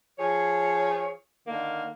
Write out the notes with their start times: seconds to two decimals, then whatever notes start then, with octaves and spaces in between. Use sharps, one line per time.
0.18 F3 G#4 C#5
1.47 D3 D#3 A#3